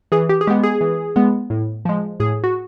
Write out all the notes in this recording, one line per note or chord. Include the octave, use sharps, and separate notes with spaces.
E3 G#4
G4
G#4
G#3 B3 G4
G#4
E3
G#3 B3
A2
F3 G#3
A2 G#4
F#4